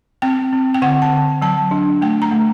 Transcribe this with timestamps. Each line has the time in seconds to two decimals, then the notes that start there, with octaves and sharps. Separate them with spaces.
0.22 C4 G5
0.53 C4
0.74 G5
0.82 D3 F#5
1.02 A5
1.12 D3
1.42 F#3 A5
1.71 D4
2.01 A3 G5
2.22 A#5
2.32 A3